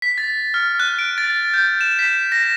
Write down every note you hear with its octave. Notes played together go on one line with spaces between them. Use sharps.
B6
A6
F6
F#6
D7
A6
G6
E7
B6
A#6